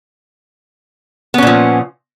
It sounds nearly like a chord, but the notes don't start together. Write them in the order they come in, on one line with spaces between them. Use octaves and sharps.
B3 C#4 A#2 F3